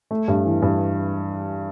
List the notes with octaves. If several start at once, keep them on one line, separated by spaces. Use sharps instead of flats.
A3
G2
E3
G2